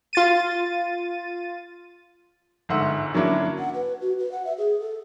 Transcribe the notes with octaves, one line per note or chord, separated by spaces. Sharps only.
F4 A6 D#7
G1 G#2 E5 F#5 C6 E6
F#3 A#3 C#4 D4 E4
F#5
B4
F#4
B4
F#5
E5
G#4
A4